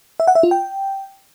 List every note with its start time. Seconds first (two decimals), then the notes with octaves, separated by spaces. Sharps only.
0.20 E5
0.27 F#5
0.35 E5
0.43 F4
0.51 G5